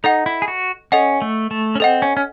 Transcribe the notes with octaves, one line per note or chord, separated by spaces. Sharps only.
D#4 A4 D#5 F#5
E4
G#4
F#4
C#4 A4 D#5 F#5
A3
A3
C#4
C4 A4 D#5 F#5
C#4
C#4